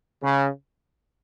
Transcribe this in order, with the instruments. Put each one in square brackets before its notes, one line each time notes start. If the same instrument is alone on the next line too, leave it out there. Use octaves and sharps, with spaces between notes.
[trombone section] C#3